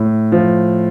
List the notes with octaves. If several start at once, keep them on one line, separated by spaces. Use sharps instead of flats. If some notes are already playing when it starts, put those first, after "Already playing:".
Already playing: A2
F3